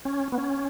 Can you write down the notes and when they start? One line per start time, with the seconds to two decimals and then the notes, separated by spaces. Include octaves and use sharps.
0.05 C#4
0.32 B3
0.38 C#4